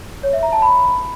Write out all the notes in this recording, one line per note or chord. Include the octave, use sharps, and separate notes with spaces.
C#5
E5
A#5
A5
B5